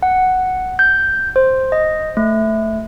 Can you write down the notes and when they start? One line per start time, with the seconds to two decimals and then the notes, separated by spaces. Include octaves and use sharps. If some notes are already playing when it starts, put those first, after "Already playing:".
0.03 F#5
0.79 G6
1.36 C5
1.72 D#5
2.17 A3